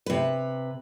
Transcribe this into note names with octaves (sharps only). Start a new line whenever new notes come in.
C3 B4